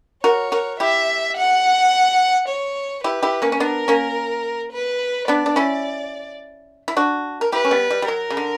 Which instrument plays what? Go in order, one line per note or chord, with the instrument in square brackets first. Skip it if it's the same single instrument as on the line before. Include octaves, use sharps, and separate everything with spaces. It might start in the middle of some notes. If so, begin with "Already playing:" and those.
[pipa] F#4 A#4 [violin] C#5
[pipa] F#4 A#4
[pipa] E4 G4 [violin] E5
[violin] F#5
C#5
[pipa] E4 G4 [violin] B4
[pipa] E4 G4
A#3 C#4
C#4
[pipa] B3 D4 [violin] A#4
[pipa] A#3 C#4
[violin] B4
[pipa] B3 D4 [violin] D5
[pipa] D4
C#4 E4
E4
D4 F#4
A#4
[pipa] E4 G4 [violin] B4
[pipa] C#4
G3 B3
G3
G3
[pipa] F#3 [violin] A#4
[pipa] C#3
D3